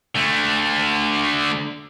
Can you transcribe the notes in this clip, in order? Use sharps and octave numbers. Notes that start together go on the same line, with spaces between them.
D3 A3